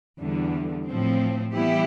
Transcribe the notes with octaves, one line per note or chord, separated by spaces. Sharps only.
E2 D3 G3
A2 F3 C4
E3 G3 B3 E4 G4